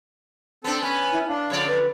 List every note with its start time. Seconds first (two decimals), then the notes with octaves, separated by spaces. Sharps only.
0.64 B3 C4 D4 A4
0.82 B3 C#4 B4 G#5
1.12 E4
1.28 D4 F5
1.50 F2 D3 C#5 D5
1.68 B4